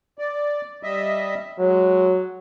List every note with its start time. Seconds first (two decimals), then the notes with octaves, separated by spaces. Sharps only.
0.18 D5
0.83 G3 D#5 E5
1.59 F#3 G#3